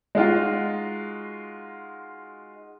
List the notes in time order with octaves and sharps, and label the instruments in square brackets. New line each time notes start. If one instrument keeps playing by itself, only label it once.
[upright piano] G#3 D#4 F4 F#4